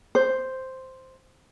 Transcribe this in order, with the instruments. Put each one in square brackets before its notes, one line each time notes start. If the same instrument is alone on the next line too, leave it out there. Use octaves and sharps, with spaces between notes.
[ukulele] C5